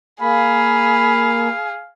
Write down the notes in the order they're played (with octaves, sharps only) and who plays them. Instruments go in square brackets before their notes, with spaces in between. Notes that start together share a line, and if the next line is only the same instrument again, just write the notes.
[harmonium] A#3 [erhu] G#4 [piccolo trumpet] F5 [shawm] B5